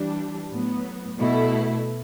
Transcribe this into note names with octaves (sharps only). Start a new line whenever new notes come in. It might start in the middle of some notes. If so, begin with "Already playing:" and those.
Already playing: E3 G3 D4
A2 F#3 B3
B2 A3 E4